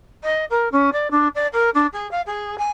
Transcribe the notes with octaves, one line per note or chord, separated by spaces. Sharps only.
D#5
A#4
C#4
D5
D4
D5
A#4
D4
G#4
F5
G#4
G#5